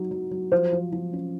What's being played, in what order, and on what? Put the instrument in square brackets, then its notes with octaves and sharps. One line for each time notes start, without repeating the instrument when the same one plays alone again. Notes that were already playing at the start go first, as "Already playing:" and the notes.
Already playing: [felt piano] F#3 D#4
F#3
F#3
[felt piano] F3 [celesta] C5
[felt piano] F3
F3
C#4